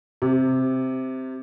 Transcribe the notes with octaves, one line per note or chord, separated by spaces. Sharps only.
C3